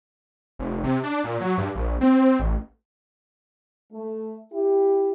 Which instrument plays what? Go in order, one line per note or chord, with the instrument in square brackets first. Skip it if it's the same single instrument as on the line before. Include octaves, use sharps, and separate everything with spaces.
[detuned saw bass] F1
C3
D4
A#2
F#3
G2
A#1
C4
A1
[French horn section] A3
E4 G4